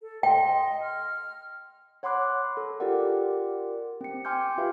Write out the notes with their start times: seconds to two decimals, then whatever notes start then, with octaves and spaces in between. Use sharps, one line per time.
0.01 A4
0.23 D#5 G5 C6
0.82 F6
2.03 C#5 F#5 B5 C6 D6 F#6
2.57 A4
2.80 F4 G4 A#4 D5 F#5
4.01 C4 C#7
4.25 G5 G#5 C6 D6 F6 G6
4.58 F4 G4 B4 E5 F5 G#5